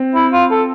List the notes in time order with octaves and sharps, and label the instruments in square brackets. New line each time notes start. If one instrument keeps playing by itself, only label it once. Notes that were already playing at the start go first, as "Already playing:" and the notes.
Already playing: [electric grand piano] C4
[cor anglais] E4
F4
A4